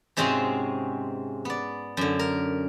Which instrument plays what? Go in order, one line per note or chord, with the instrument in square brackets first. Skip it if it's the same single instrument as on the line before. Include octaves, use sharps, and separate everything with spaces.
[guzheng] G#2 C3 G#3 C4 C#4 F#4
B3 D5
F#2 D3
A#4